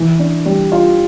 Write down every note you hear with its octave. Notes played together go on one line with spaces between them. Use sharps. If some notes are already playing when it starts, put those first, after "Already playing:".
Already playing: E3
D4
G3
F4